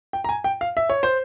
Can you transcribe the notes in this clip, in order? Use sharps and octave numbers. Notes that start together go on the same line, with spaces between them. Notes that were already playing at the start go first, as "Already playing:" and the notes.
G5
A#5
G#5
G5
F5
E5
C#5
C5